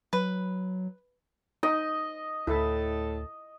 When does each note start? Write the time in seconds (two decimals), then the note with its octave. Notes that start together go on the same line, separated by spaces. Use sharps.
0.13 F#3 B4
1.63 D#4 D#5
2.47 D2 A2 E4 A4